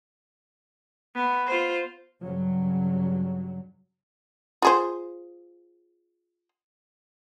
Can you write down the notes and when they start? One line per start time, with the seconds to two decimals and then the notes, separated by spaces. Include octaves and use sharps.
1.15 B3
1.46 F4 C5
2.21 G2 C#3 F#3
4.62 F4 G#4 C5